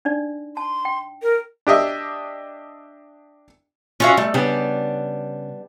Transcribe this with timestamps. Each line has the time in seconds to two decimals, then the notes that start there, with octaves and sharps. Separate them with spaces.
0.05 D4 D#4 D5
0.57 A5 C6
0.85 G5
1.22 A#4
1.67 D4 G4 D#5 E5
4.00 C#4 F4 F#4 E5 F5
4.17 G3 A3
4.34 C#3 G3 B3 D4